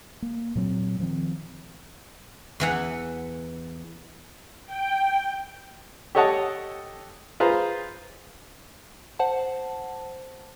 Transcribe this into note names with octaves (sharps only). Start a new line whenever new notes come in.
A#3
A#2 F#3 C4
D#3 F3 G#3 C4
E2 E3 F#5
G5
G4 A4 C#5 D#5 F#5 A5
F4 G#4 B4 C5 A#5
C5 F#5 A5